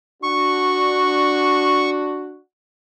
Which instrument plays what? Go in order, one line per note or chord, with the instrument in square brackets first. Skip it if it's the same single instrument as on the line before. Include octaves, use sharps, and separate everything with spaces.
[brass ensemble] D4 F#4 [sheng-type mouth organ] C#6